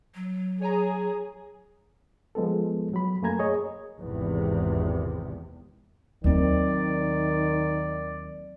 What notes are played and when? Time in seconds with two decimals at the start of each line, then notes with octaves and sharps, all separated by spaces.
0.15 F#3
0.61 G#4 C#5 G#5 A#5
2.35 F3 G#3 B3 A4
2.93 F#3 B5
3.22 F#2 A3 A#3 G#5 A#5 G#6
3.39 G#4 C#5 D#5
4.00 G#1 E2 C3
6.24 D#2 D#3 F#3 C4 D5